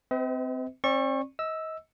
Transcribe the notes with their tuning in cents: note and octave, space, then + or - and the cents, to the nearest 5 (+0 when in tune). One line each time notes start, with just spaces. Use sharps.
C4 -20 B4 +45 D#5 +45
C4 +40 D5 +0 C#6 -25
D#5 +30 E6 +0